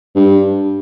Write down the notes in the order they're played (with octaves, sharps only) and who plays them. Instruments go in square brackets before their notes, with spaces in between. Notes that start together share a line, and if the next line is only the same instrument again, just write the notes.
[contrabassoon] G2